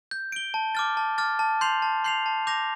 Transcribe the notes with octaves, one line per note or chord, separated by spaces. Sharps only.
G6
D7 G7
A5
D6 F6 A6
A5
D6 F6 A6
A5
C6 G6 C7 F7
A5
C6 G6 C7 F7
A5
D6 G6 A#6 F7